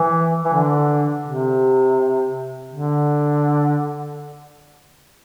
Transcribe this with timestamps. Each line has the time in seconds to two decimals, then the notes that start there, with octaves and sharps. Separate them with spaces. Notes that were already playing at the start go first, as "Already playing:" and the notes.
Already playing: E3
0.45 E3
0.53 D3
1.27 C3
2.73 D3